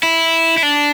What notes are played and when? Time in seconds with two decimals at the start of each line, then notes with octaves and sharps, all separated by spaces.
0.03 E4
0.58 E4
0.63 D4